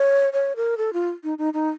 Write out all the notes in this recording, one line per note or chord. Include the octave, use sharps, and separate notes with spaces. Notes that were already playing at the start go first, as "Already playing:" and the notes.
Already playing: C#5
C#5
A#4
A4
F4
D#4
D#4
D#4